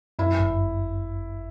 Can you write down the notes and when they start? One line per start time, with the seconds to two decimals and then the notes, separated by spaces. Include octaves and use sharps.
0.19 F#2 E4
0.38 G1